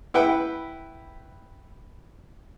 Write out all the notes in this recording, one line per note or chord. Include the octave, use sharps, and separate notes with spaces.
E4 B4 F#5 G5